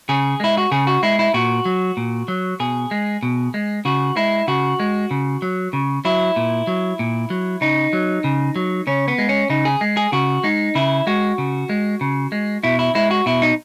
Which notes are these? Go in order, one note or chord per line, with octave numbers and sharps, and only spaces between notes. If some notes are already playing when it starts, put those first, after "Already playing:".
C#3 G#4
G#3 E4
F#4
C#3 G#4
F#4
G#3 E4
E4
A#2 F#4
F#3
A#2
F#3
B2 G#4
G#3
B2
G#3
C#3 F#4
G#3 E4
C#3 F#4
G#3
C#3
F#3
C#3
F#3 E4
A#2
F#3
A#2
F#3
C#3 D#4
F#3
C#3
F#3
C#3 C#4
B3
G#3
C#4
C#3 D#4
G#4
G#3
G#4
C#3 F#4
G#3 D#4
C#3 E4
G#3 F#4
C#3
G#3
C#3
G#3
B2 E4
E4
G#3 E4
F#4
B2 E4
D#4